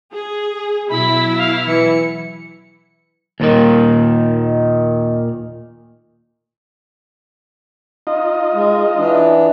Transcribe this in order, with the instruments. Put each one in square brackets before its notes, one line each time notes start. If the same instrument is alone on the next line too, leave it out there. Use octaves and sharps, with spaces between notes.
[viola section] G#4
[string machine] B2 F#3 [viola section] E4 [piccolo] B5
[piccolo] F5
[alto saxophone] E3 [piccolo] C#7
[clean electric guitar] D#2 A#2 D#3
[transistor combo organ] D#4 F4 D#5
[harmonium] G#3
E3 D4